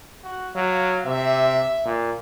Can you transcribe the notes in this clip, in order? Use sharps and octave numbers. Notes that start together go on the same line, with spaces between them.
F#4
F#3 F5
C3 E5
A#2